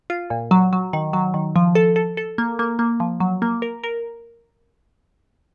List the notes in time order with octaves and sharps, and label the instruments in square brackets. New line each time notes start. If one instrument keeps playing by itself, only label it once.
[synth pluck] F4
A#2
F#3
F#3
D#3
F#3
D#3
F3
A4
A4
A4
A#3
A#3
A#3
F3
F#3
A#3
A#4
A#4